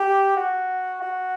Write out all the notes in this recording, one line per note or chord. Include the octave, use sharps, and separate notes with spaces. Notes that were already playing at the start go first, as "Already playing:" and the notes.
Already playing: G4
F#4
F#4